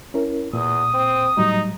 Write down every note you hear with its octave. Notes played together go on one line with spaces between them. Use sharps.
C#4 E4 A#4
E2 A#2 D#6
C4
A2 F#3 G3 D#4